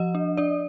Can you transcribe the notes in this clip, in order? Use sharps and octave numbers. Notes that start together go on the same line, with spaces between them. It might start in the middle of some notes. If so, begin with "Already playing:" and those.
Already playing: F3 D#5
D4
D4 D5